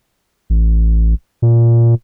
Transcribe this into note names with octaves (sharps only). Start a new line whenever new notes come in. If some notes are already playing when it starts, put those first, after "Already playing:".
A1
A#2